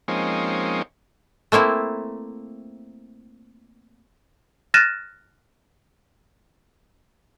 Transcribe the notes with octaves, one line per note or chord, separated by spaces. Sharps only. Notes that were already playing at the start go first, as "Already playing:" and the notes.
F3 G#3 A#3 C4 C#4 D#4
A3 A#3 C4 E4
F6 F#6 A6 A#6 D#7 E7